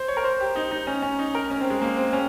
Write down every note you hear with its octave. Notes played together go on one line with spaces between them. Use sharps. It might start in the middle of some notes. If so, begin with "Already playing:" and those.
Already playing: C5
C#5
A#4
C5
G4
D#4
D#4
C#4
C#4
D#4
A#4
C#4
C4
G#3
A#3
C4
C#4